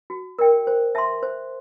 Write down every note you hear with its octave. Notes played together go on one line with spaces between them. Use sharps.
F#4
A#4 D5 G5
C5
E5 A5 C6
C5